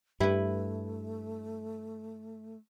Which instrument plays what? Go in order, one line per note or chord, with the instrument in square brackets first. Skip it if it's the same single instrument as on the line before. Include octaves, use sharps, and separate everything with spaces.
[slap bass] G2 [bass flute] A3 [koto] E4 B4 [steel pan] G4